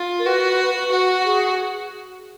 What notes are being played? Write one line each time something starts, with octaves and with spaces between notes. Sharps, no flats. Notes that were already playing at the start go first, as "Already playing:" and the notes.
Already playing: F4
A#4
F#4 B4
F#4
G#4